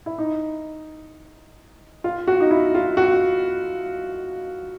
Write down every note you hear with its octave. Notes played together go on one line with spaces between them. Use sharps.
E4
D#4
F4
F#4
D#4
E4
F4
F#4